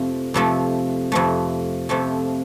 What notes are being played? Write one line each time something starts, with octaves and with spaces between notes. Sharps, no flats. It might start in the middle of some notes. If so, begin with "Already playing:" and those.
Already playing: F2 C3 F3 A3
F2 C3 F3 A3
F2 C3 F3 A3
F2 C3 F3 A3